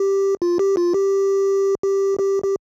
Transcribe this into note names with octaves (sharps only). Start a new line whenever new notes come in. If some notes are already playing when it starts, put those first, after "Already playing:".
Already playing: G4
F4
G4
F4
G4
G4
G4
G4